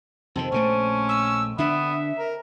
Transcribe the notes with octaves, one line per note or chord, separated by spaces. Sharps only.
F2 C3 D#3 C4 A4 D#5
A#1 C#3 A3 C#4
E6
D3 B3 D4 E5
A#4